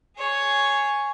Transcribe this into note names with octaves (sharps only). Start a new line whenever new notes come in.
G#4 C#5